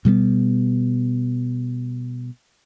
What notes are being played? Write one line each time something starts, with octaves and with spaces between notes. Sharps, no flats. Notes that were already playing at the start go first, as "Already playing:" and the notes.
B2 G3 G#3 B3